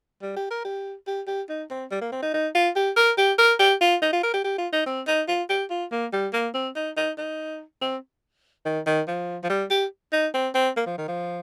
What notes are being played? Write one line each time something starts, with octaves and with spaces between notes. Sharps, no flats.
G3
G4
A#4
G4
G4
G4
D#4
C4
G3
A#3
C4
D#4
D#4
F4
G4
A#4
G4
A#4
G4
F4
D#4
F4
A#4
G4
G4
F4
D#4
C4
D#4
F4
G4
F4
A#3
G3
A#3
C4
D#4
D#4
D#4
C4
D#3
D#3
F3
F3
G3
G4
D#4
C4
C4
A#3
F3
D#3
F3